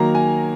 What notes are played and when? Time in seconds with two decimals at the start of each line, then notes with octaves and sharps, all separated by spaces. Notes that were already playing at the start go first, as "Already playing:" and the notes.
Already playing: D#3 F#3 A#3 A#5
0.15 G#5